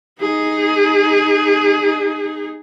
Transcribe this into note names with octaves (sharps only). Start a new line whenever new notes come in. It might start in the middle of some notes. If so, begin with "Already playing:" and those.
D#4 G#4